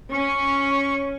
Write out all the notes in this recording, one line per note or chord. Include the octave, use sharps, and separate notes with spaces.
C#4 C#6